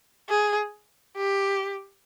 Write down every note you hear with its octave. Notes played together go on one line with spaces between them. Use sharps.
G#4
G4